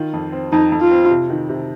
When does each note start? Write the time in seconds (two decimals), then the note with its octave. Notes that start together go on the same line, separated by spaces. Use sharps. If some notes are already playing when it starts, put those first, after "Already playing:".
Already playing: D#3 F4
0.13 F2
0.32 C4
0.52 F2 D#4
0.72 F2
0.81 F4
0.91 C4
1.11 C3
1.30 D#3
1.49 C3